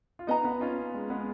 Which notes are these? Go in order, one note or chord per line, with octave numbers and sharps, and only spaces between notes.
F4
B3 D#4 B4 D#5 A#5
B3 D#4
C#4 F4
G#3
G#3 B3